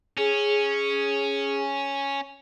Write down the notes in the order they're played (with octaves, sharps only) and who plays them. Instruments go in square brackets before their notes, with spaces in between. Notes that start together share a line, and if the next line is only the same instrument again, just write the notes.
[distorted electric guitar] C#4 [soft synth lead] G#4